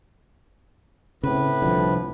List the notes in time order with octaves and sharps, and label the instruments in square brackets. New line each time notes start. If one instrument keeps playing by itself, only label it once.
[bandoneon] A2 B4 [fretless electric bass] C#3 C4
[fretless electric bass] C2 D3 [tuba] F3